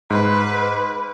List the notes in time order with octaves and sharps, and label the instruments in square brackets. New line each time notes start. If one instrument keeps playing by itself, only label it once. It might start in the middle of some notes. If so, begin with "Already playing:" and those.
[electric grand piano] G#2 [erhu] B4